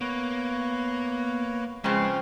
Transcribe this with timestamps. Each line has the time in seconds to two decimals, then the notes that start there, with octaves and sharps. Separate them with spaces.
0.01 A#3 B3 B4 C#5
1.84 C#3 F3 G#3 C4 B4